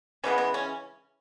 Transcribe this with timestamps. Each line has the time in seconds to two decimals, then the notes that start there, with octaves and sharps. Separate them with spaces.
0.24 C#3 E3 G#3 B3 C#4
0.38 B3
0.54 C#4